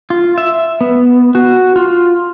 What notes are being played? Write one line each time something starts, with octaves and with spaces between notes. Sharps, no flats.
F4
E5
B3
F#4
F4